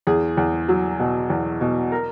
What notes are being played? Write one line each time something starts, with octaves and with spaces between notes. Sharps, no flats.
E2 G#4
E2
F#3
B2
E2
B2
A#4